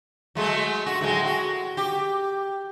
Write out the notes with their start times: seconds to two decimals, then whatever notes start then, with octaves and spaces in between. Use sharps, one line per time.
0.35 F#3 G#3 A3
0.86 F#4
1.01 A2 F#3 G#3
1.25 F#4
1.77 G4